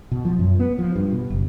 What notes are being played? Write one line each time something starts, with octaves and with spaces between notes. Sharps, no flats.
B2
F3
F#2
B3
F3
G2
B2
F#1